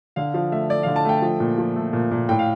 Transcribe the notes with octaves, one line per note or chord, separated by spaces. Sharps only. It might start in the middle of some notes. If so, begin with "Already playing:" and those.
D3 F5
F3 F5
A3 E5
A3 D5
D3 F5
A5
A3 G5
F3
A#2
F3
A3
A#2
A#2
A2 G5
F5